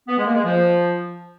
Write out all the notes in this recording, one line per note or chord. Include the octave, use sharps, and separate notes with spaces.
B3
G#3
A#3
G#3
F3